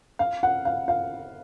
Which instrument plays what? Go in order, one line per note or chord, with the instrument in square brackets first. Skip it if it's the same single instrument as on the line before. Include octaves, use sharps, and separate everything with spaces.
[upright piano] F5
F#5
F5
F5